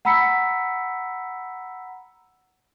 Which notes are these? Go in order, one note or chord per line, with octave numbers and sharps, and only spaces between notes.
F#5 A#5 B5 E6 B6 C#7